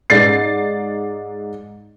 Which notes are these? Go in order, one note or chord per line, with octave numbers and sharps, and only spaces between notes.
G#2 D5 A6 C7